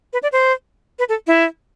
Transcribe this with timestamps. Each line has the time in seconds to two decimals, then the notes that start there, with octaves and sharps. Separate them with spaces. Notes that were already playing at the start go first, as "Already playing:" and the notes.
0.13 B4
0.23 D5
0.32 C5
0.99 B4
1.09 A4
1.27 E4